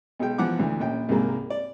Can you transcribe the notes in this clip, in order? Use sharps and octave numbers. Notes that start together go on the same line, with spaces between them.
B1 G#3 G5
E3 F3 B3 F#5 D6
D2 E3
A#1 C#4 G5
C2 G#2 C3 G#3 A#3
D5